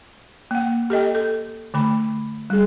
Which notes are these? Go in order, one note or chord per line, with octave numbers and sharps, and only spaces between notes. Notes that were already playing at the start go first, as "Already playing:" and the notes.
A#3 F#5
G4 A4 D#5 G5
A4
D3 A3 B5
G3 G#4